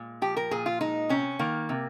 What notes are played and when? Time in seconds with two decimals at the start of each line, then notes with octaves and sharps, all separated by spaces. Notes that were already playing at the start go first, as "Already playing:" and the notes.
Already playing: A#2 G#3
0.22 F3 G4
0.37 A#4
0.51 A#2 G#4
0.66 F4
0.81 G#3 D#4
1.09 C3 C#4
1.39 D#3 A#3
1.69 C3